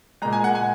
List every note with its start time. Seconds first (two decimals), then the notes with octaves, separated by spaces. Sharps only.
0.22 A#2 G#3 A#5
0.33 G#5
0.44 F#5
0.55 G#5